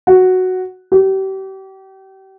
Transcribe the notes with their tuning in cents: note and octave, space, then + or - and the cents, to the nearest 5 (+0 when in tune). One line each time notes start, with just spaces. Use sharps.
F#4 +0
G4 -35